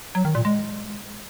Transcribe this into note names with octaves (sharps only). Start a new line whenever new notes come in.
F#3
D#3
A#2
G#3